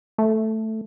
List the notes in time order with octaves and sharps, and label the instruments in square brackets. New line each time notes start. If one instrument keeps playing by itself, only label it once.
[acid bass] A3